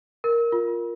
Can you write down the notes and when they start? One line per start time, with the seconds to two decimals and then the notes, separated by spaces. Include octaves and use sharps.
0.24 A#4
0.52 F4